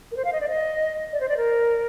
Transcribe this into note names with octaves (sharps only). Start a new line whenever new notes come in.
A#4
C5
F5
D#5
D5
D#5
D5
C5
D5
A#4